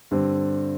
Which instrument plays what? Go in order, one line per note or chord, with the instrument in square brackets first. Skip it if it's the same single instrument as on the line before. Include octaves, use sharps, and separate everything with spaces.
[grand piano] G2 D3 G3 C4 G4